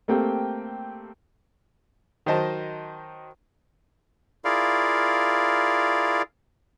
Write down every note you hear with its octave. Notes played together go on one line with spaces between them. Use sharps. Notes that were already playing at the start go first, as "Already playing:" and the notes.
A3 A#3 C4 G4 G5
D#3 F#3 C5 D#5 A5
E4 F4 G#4 A#4 D5 F5